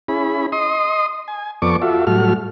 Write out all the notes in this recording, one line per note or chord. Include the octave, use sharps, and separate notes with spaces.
C#4 E4 G#4 B5
D#5 C6 D#6
G#5
F2 B3 A4 D5 C#6 D6
F4 F#4 A4 E5
A2 F#3 G3 F#4 A4 F6